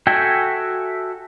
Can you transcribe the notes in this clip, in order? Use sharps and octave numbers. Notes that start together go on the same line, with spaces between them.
F#4 A4 E5 G5 G#5